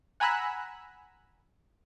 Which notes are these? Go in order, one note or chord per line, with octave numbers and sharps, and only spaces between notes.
F#5 G#5 A#5 B5 E6 F#6